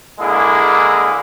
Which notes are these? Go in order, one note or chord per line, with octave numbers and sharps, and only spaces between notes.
D3 G#3 A#3 E4 G#4